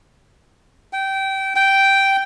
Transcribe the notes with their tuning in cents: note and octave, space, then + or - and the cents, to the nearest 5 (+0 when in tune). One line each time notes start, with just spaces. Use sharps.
G5 -20
G5 -5